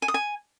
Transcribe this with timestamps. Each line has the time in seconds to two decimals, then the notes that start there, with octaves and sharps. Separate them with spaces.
0.02 G#5
0.08 D#6
0.14 G#5